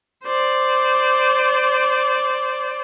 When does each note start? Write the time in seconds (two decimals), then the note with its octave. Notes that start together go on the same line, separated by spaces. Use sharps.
0.25 C5 D5